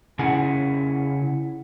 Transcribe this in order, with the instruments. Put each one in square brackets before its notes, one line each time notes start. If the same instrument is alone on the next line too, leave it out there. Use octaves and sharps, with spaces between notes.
[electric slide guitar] C#3 C#4 E4 G#4 F#5 G#5